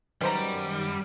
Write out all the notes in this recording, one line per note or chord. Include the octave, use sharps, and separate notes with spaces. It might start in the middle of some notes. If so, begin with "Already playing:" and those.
F#2 D#3 G3 B3 C5 A#5